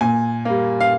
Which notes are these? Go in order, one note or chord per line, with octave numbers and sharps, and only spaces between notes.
A#2 G#5
G3 A#3
F5